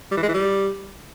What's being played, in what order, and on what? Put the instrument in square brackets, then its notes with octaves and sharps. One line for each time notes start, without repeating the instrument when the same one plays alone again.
[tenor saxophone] G3
E3
G#3
E3
G3